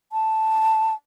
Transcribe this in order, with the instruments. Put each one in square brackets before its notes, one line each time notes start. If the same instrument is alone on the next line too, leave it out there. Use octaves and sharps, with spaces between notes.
[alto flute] A5